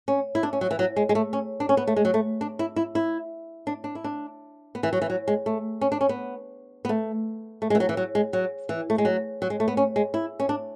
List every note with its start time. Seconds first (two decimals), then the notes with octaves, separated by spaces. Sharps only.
0.08 C#4
0.35 E4
0.43 D4
0.53 C#4
0.61 F#3
0.71 E3
0.79 F#3
0.96 G#3
1.09 G#3
1.15 A3
1.33 C#4
1.60 D4
1.69 C#4
1.77 B3
1.87 A3
1.96 G#3
2.05 F#3
2.14 A3
2.41 D4
2.59 E4
2.76 E4
2.95 E4
3.67 D4
3.84 D4
3.95 E4
4.04 D4
4.75 B3
4.83 E3
4.93 F#3
5.02 E3
5.10 F#3
5.28 G#3
5.46 A3
5.81 C#4
5.92 D4
6.01 C#4
6.09 B3
6.85 B3
6.89 A3
7.62 A3
7.70 G#3
7.75 E3
7.80 F#3
7.89 E3
7.97 F#3
8.15 G#3
8.33 F#3
8.69 E3
8.90 A3
8.98 G#3
9.05 F#3
9.42 F#3
9.50 G#3
9.60 A3
9.68 B3
9.77 C#4
9.96 G#3
10.14 E4
10.40 C#4
10.49 D4